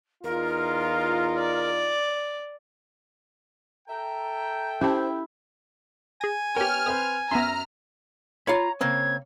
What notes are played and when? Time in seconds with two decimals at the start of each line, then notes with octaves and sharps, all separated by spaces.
0.24 E2 D#4 F4 A#4
1.38 D5
3.88 A4 E5 G5 A#5
4.81 C#4 E4 G4 C5 A5
6.21 G#4 G#5 A#6
6.56 B3 G4 A#4 C#5 G5 F6
6.86 C4 B4 C5 D#6
7.31 F#2 B3 E5 A#5 C6 F6 D#7
8.47 F4 C#5 F5 A#5 B5
8.81 C#3 A#3 C4 G#6